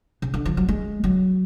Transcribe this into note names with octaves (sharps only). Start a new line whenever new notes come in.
C#3
D3
F3
F#3
G#3
F#3